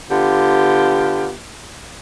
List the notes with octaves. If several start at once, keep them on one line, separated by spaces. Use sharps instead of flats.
D3 B3 F4 G4